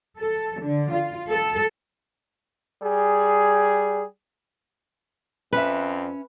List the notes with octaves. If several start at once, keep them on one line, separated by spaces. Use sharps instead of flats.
A4
D3
F4
A4
G3 G#4
F2 C#4 B4 E5